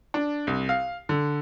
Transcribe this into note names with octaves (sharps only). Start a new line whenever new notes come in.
D4
C2
F5
D3